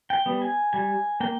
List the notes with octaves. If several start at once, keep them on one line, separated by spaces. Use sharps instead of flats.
G5
G3 B3
G#5
G3 G#5
A#3 G5